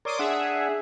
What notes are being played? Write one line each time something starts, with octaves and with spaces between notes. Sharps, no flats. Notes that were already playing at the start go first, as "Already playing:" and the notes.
A#4 C#5 D5 C6 D6 D#6
D4 G#4 E5 F#5